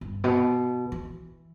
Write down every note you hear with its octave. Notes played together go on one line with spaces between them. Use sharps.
G2
B2
E3